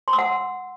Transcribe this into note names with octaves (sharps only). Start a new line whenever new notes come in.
C6
E6
F#5